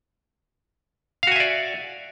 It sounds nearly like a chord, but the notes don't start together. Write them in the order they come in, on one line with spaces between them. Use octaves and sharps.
F5 F#4 G#5 E5 D5